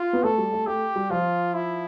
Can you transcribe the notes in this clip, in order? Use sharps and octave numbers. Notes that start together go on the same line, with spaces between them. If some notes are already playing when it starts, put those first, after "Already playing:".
Already playing: F4
B3
A3 A4
G3
A3
A3 G4
G3
F3 F4
E4